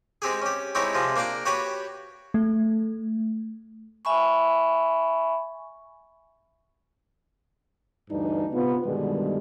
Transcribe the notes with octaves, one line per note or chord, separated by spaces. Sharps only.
G#3 C4 G4 G#4
C#4 G4
G#3 C4 D#4 E4 G4 C#5
C3 F3 G#3
A#3 D4 F5 G5 A#5
F#4 G4 B4 C#5 G5
A3
E5 G#5 B5 C#6
D2 G2 E3 D4 D#4
C3 B3 F4
G2 B2 D3 D#3 G3 G#3